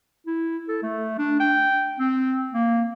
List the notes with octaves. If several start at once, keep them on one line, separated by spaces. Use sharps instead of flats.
E4
A4
A3
D4
G5
C4
A#3